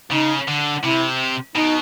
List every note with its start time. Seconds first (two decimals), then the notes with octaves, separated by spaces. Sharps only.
0.11 C#3 D#4
0.48 D3
0.83 C3 E4
1.55 B2 D#4